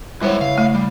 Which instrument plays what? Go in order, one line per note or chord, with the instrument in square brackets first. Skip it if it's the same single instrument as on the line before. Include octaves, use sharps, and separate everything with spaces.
[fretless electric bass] G3 [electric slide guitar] G#3 B4 F#5 [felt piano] E4 C#5
[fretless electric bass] C#3 [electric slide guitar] F5
[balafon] A3
[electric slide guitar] G3